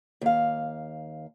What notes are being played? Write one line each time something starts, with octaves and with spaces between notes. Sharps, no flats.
D#2 F5